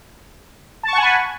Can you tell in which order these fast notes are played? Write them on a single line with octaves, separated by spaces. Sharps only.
A5 C#6 F#5 G#5 B5